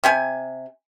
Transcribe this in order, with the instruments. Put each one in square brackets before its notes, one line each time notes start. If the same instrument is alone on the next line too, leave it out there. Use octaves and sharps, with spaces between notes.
[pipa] C3 G4 G#5